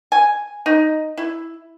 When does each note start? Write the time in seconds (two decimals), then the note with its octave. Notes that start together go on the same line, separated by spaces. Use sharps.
0.12 G#5
0.66 D#4
1.18 E4